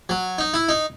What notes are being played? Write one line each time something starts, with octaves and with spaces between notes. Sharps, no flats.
F#3
D#4
E4
D#4